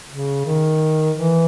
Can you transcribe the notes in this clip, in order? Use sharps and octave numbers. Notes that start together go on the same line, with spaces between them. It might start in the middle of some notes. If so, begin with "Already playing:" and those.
C#3
D#3
E3